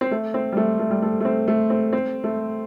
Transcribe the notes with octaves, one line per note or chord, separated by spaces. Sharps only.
C4
A3
C4
G3
A3
A3
G3
A3
A3
C4
A3
C4
C4
A3